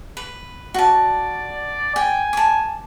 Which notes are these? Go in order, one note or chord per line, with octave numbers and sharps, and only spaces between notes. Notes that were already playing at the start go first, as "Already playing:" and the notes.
B4
F#4 D5 A5
G5 G#5
A5 D6